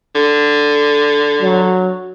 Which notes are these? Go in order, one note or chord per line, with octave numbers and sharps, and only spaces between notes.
D3
F#3